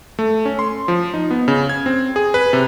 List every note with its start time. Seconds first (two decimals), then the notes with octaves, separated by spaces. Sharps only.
0.19 A3
0.45 C#4
0.59 C6
0.88 F3
1.14 D#4
1.31 B3
1.48 C#3
1.69 G#6
1.86 C4
2.16 G#4
2.34 B4
2.53 C3